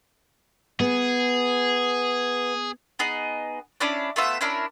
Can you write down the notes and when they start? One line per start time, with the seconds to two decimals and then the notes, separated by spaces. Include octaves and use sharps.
0.80 B3 G#4
2.99 B3 D#4 G#4 D#5
3.80 C#4 D4 E4 D5
4.16 A3 B3 F4 E5
4.41 C#4 D4 E4 A#4